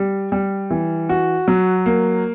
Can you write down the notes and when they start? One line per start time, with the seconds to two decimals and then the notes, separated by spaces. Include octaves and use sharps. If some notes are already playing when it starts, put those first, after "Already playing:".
Already playing: G3
0.32 G3
0.71 E3
1.09 F#4
1.48 F#3
1.86 A#3